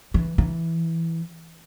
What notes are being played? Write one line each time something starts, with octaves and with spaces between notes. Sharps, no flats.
E3
E3